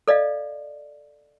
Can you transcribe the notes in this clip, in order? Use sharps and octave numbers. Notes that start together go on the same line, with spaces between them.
A4 D5 D#5 F5